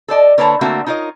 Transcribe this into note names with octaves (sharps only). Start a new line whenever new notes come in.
A4 C5 D5 D#5
D3 A#3 B4 C#5 A5 A#5
D3 A3 A#3 C4 F#4 E5
D#4 F4 A#4 C#5 D#5